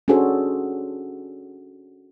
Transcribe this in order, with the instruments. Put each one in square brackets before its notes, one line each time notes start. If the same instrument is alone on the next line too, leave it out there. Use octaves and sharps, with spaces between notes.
[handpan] C#4 D4 F#4 G#4 A4 C5